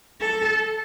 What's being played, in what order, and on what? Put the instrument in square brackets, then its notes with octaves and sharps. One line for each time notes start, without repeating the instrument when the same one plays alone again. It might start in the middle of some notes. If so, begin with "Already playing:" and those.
[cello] A4